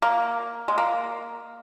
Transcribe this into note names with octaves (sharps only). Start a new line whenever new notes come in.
A#3
G#3
A#3